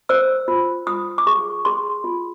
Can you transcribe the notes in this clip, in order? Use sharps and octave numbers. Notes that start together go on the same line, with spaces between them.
C5 E6
F4
F4 D#6
D6
G#4 C#6
G#4 C6
F4